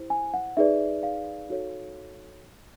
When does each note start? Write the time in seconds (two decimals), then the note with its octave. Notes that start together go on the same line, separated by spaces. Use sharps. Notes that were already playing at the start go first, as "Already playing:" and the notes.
Already playing: E4 G4 C5
0.10 G#5
0.34 F#5
0.57 D#4 G#4 B4 D5 E5
1.03 F5
1.49 D#4 F#4 A4 C#5